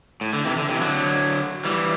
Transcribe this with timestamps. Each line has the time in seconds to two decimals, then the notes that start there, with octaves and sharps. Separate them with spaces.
0.21 A2
0.33 D3
0.45 C3 E3
0.57 D3
0.69 C3 E3
0.81 D3 F#3
1.65 E3 G3